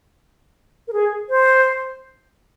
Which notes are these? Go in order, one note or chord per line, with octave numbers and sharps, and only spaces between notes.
A#4
G#4
C5